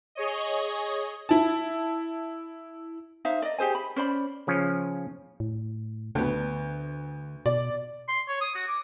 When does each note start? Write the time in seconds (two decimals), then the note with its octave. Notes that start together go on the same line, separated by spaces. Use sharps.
0.15 G#4 C#5 D#5
1.29 E4 A5
3.25 D#4 C5 E5 F5
3.42 D5 D#5
3.58 G4 G#4 C5 G#5
3.75 B5
3.96 C#4 C5 D5 B5
4.47 C#3 F3 C#4
5.40 A2
6.15 D2 D3 B3
7.46 B2 D5
8.08 C6
8.28 C#5
8.41 D#6
8.55 F#4
8.68 D6